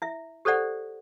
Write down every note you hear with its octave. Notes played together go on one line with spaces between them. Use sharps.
E4 E5
G4 A4 C5 D5 F#5